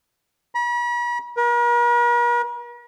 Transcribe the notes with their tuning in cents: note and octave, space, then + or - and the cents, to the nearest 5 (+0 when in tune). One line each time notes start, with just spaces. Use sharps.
B5 -45
A#4 +45